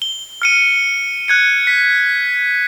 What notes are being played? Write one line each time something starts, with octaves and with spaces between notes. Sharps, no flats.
G7
F6 C#7 D#7
F#6 G#6 C#7
B6